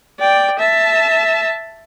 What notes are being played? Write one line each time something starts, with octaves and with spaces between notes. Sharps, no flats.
D5 G5
E5 A5